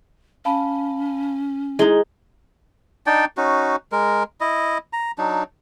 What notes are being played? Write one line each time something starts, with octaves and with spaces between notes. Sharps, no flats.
C#4 F5 A5 B5
G#3 D#4 E4 D#5 G7
D4 D#4 D5 G5
C#4 D#4 F#4
G#3 A#4
E4 D#5
A#5
F#3 D4 D#4